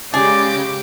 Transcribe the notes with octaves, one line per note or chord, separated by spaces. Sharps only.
C#3 G#3 G4 G#4 D5